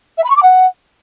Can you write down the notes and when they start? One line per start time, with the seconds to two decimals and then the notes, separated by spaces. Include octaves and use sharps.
0.18 E5
0.24 B5
0.30 C#6
0.37 D6
0.43 F#5